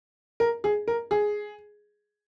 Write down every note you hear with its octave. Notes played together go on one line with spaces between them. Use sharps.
A#4
G#4
A#4
G#4